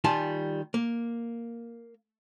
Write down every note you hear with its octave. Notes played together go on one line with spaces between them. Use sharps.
D#3 G3 F4 G#5 A5
A#3